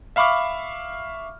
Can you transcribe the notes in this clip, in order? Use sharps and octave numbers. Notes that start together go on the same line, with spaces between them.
E5 F5 B5 C#6 D6 F6